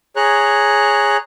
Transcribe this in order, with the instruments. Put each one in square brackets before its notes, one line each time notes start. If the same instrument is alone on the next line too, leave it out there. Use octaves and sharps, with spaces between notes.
[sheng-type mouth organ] G#4 C#5 A#5 F#6